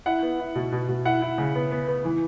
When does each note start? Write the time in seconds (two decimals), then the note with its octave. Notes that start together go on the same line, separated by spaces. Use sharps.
0.06 E4 F#5
0.22 B3
0.39 E4
0.55 B2
0.72 B2
0.88 B2
1.05 E4 F#5
1.22 E4
1.38 C#3
1.55 B3
1.72 B3
1.88 B3
2.05 E3